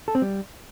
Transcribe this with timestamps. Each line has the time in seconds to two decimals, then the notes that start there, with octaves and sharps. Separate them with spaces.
0.08 A4
0.15 C4
0.22 G3